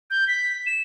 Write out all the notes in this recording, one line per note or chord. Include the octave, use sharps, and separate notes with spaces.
G6
B6
E7